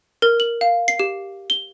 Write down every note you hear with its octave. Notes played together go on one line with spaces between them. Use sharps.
A#4
F#7
F5
C7
G4
G7